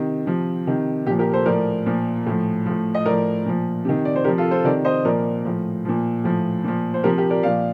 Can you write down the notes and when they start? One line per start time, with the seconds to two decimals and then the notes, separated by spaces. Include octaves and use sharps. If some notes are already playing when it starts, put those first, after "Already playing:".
Already playing: C3 D#3
0.26 C3 F3
0.67 C3 D#3
1.06 A#2 G4
1.10 F3
1.19 G4 A#4
1.33 A4 C5
1.46 A2 F3 A#4 D5
1.86 A#2 F3
2.26 A2 F3
2.66 A2 F3
2.95 D#5
3.05 A2 F3 A#4 D5
3.46 A#2 F3
3.85 C3 D#3
4.05 D5
4.16 C5
4.24 C3 F3 G4 A#4
4.38 F4 A4
4.51 A4 C5
4.65 C3 D#3 A#4 D5
4.85 C5 D#5
5.05 A#2 F3 A#4 D5
5.45 A2 F3
5.85 A#2 F3
6.24 A2 F3
6.64 A#2 F3
6.94 C5
7.03 C3 F3 G4 A#4
7.18 G4 A#4
7.30 A#4 D5
7.43 A#2 F3 D5 F5